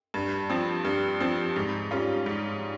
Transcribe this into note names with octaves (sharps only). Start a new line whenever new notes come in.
G2
F3 C4
G2
F3 C4
G#2
G3 C#4 F4
G#2